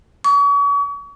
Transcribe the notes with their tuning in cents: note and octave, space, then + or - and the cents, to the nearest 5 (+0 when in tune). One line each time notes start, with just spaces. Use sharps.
C#6 +40